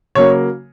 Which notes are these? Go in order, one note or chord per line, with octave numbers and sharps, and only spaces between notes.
C#3 F#3 A#3 C#5